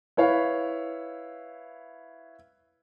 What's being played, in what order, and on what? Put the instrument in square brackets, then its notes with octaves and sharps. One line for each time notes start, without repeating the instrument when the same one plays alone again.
[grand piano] E4 B4 C#5 F5